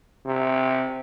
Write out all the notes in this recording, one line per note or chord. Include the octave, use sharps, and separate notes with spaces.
C3